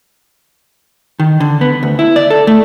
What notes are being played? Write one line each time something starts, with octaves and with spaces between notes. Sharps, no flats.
D#3
D3
B3
D2
E4
D5
A4
A3